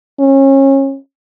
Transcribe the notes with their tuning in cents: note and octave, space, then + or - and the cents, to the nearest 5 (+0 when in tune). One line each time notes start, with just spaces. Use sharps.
C#4 -30